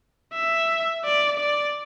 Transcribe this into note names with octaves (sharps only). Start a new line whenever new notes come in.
E5
D5
D5